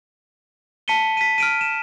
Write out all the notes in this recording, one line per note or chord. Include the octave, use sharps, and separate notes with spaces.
A5 B6 C#7 D#7 G7
B6 D#7
F6 D7 D#7
E7